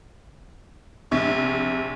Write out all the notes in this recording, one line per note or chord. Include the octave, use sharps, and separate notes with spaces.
A#1 C3 C#6